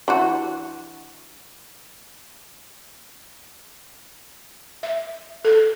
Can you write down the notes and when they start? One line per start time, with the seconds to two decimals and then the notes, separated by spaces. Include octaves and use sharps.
0.08 E3 D4 F#4
4.83 E5
5.45 A4